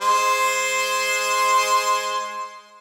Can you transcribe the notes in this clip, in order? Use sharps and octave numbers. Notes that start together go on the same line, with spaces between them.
G#3 C5 C6